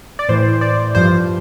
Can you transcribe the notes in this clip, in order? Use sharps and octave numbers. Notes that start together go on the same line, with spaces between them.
D5
A2 E3 C5
D5
G2 F3 C5